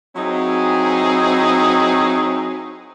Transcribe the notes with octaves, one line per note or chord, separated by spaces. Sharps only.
F#3 C4 D#4 E4 G#4